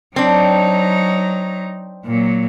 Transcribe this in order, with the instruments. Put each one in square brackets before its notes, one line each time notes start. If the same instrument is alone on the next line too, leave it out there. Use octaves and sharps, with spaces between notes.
[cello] F#3 D#4 [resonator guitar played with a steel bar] C4 D4
[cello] A#2 F#3